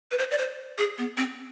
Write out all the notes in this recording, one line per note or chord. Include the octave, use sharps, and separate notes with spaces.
B4
C5
D5
C5
G#4
B3
C4